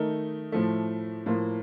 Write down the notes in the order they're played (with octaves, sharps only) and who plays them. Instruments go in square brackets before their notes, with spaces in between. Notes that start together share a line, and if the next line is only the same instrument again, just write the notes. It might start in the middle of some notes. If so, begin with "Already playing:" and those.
Already playing: [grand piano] D#3 A3 D#4 A#4
A2 F3 A3
A2 F3 A#3 F4